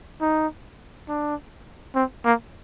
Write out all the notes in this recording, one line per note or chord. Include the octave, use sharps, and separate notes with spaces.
D#4
D4
C4
A#3